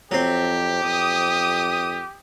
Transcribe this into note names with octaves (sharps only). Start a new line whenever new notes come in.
F2 F#3 C4 G4
F2 D#6